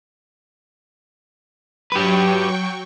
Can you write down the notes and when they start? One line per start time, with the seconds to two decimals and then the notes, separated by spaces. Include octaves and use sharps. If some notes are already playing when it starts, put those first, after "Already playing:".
1.92 F#3 G4 B4 G5 C#6